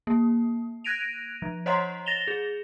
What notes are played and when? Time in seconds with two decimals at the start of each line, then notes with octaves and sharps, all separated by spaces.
0.07 A#3
0.84 F#6 G#6 A#6 D7 D#7 F7
1.42 F3
1.66 C5 C#5 D#5 F#5 A#5 C6
2.06 A6 A#6 E7 F7 G7
2.28 G#4